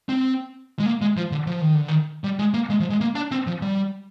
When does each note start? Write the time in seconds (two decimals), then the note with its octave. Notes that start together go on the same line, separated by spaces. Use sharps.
0.09 C4
0.79 G#3
0.86 A#3
1.02 G#3
1.17 F3
1.32 D3
1.47 F3
1.61 D#3
1.75 D3
1.88 D#3
2.24 G3
2.39 G#3
2.54 A#3
2.70 G#3
2.80 F3
2.90 G#3
3.01 A#3
3.15 D4
3.32 C4
3.47 F3
3.62 G3